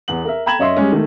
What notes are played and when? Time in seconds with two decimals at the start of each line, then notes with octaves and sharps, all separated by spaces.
0.08 E2 B3 F#7
0.25 A#4 E5
0.46 G5 A#5 B5 G#6 E7 F#7
0.59 F#2 C#5 D#5 E5 C6
0.76 G3 G#3 C#4
0.92 D#3 A3